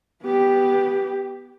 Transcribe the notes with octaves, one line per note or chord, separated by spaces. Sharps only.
B3 G4